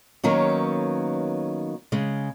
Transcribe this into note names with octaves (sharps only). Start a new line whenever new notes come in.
D#3 F#3 A#3 B3 C#4
C#3 G#3